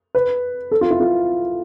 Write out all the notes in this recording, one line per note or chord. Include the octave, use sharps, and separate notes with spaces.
B4
A4
F4
E4
F4